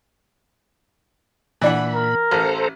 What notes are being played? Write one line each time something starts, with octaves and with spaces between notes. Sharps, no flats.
A#2 E3 D4 F#5 B5
A#4
A1 A4 C5 A#5